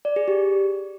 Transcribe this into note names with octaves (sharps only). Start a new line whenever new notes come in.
D5
G#4
G4